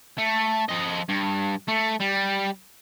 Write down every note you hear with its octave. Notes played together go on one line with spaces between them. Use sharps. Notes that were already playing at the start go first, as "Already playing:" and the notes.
A3
F3 D#5
G2
A3
G3